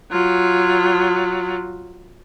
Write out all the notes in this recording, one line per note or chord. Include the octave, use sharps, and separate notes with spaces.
F#3 F4